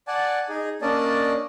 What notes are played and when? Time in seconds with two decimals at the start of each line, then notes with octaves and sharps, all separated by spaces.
0.07 D5 F#5 G#5 A5
0.49 D#4 G#4
0.82 A#3 C#4 D4 D5 D#5 A5